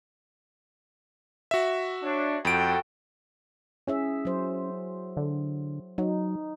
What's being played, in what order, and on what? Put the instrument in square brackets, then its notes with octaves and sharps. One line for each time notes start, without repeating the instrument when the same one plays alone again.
[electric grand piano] F#4 E5
[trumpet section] D4 C#5
[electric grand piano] F2 D7 [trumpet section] F#4 A4 G5
[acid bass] C#4 [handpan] E4 G#4 E5
[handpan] F#3 C5
[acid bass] D3
[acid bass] F#3 [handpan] D#4